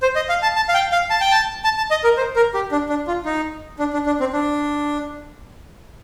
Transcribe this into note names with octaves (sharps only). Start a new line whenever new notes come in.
C5
D#5
F5
A5
A5
F5
G5
F5
A5
G5
A5
A5
A5
D#5
A#4
C5
A#4
G4
D4
D4
F4
D#4
D4
D4
D4
C4
D4